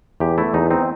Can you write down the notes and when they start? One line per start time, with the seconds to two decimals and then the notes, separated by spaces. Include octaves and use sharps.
0.20 E2 G4
0.38 A3 E4
0.54 E2 D#4
0.70 C4 D#4